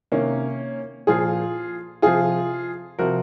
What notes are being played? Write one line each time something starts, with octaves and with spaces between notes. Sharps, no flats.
C3 D#3 A#3 C#4
A#2 F3 F4 G#4
C3 F3 F4 G#4
C3 F3 F#4 A#4